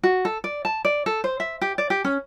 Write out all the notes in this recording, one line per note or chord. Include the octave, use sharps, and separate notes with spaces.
F#4
A4
D5
A5
D5
A4
C5
E5
G4
D5
G4
C#4